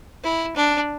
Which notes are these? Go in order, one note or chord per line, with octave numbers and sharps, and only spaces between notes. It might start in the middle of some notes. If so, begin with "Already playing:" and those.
E4
D4